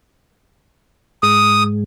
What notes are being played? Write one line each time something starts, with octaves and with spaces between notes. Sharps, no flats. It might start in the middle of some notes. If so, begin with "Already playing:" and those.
G#2 G#3 D#6